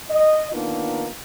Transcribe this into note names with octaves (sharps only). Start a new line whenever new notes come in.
D#5
D#3 A#3 B3 D4 D#4 F4